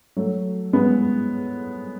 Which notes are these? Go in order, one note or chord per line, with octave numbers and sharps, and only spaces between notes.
F#3 A3
G#3 B3